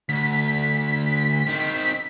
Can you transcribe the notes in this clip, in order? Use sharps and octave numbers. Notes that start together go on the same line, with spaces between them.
D2 B6
D#3 C4